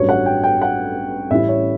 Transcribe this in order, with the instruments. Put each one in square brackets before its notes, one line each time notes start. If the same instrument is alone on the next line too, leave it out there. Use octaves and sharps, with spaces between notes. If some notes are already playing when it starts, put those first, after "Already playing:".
Already playing: [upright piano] A1 G2 F#3 C#5
F#5
G5
G5
F#5
A1 A2 G3 C#4 E4 E5
C#5